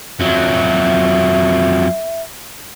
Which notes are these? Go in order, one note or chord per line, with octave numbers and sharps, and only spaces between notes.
F2 F#3 E5